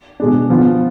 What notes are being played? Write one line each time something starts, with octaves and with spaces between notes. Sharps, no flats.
B2 G#3 D4
F3 B3 F4